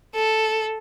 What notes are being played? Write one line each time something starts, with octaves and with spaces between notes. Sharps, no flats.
A4